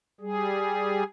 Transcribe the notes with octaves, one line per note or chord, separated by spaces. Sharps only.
G3 G#4